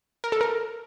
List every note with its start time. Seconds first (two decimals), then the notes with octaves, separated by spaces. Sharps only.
0.24 A#4
0.32 A4
0.41 A#4